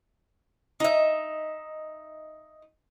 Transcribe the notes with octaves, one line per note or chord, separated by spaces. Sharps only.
D#4 E5